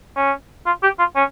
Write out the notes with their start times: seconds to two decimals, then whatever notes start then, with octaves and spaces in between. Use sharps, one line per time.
0.16 C#4
0.66 F4
0.83 G4
0.99 F4
1.16 C#4